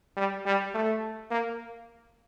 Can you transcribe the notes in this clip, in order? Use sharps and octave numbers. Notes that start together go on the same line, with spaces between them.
G3
G3
A3
A#3